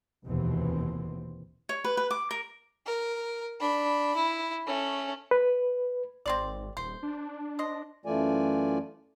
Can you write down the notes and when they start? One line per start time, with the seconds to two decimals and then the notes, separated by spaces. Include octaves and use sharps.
0.25 F1 D#2 B2 E3 C4
1.69 C#5
1.84 B4
1.97 B4
2.11 D6
2.31 A#4
2.86 A#4
3.60 D4 B5
4.16 E4
4.66 A3 C#4
5.31 B4
6.26 G#1 C4 C5 D5
6.77 D#1 C5
7.03 D4
7.59 C5 D#5
8.06 F#2 E3 A3 F4 D5 G#5